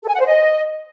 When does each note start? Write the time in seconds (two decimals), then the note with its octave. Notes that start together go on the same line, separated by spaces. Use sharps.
0.03 A4
0.09 G#5
0.14 F#5
0.20 C5
0.26 D#5